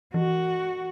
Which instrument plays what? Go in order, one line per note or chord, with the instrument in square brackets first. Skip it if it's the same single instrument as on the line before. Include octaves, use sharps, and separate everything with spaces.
[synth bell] E3 [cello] F#4